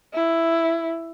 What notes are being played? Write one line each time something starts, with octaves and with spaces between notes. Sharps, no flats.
E4